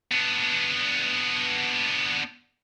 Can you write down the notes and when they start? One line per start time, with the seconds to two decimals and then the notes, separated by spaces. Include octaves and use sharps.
0.12 B3 D4